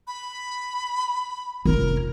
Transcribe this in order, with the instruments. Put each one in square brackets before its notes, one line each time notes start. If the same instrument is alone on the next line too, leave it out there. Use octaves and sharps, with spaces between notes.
[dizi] B5
[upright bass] F1 C#4 [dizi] A#4